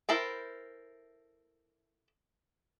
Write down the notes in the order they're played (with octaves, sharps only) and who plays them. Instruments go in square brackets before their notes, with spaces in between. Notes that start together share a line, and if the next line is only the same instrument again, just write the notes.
[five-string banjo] E4 A4 A#4 C5 G5